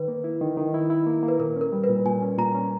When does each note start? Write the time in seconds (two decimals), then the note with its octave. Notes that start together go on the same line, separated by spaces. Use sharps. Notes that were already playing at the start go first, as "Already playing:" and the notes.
Already playing: D#3 B4
0.08 A#3
0.24 E4
0.41 D#3
0.57 D#3
0.74 E4
0.90 E4
1.07 A#3
1.23 A#3
1.28 B4
1.39 A#2 A#4
1.56 C#4
1.61 A#4
1.72 G3
1.84 B4
1.89 A#2
2.06 A#2 G#5
2.22 C#4
2.38 A#2 A#5
2.55 C#4